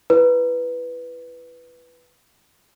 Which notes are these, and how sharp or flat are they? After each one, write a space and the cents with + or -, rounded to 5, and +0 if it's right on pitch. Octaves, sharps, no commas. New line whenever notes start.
E4 +25 B4 +0